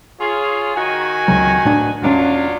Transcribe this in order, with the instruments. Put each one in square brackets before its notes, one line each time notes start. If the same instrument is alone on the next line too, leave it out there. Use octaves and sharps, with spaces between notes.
[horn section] F4 G#4 C#5
D#3 F#4 G#5
[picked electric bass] C#2 C#3 F#3
A2 D4
[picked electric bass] E1 G2 C#4 [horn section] F#3 D4 F4